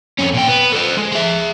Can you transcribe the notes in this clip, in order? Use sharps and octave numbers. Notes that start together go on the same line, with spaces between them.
F2 C#4
A#2 G5
B3
A4 C5
G#3
G#4 E5